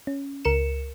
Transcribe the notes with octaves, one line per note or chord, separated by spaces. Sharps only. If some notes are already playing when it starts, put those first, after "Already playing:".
C#4
C#2 A#4 C#7 E7